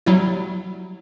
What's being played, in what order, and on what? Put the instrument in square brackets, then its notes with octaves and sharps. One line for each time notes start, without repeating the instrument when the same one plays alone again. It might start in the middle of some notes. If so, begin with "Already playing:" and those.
[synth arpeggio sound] F#3 G3 E4